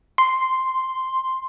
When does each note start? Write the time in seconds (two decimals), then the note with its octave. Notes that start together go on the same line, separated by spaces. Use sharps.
0.18 C6